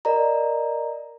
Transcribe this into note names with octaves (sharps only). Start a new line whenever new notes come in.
A#4 D5 D#5 A#5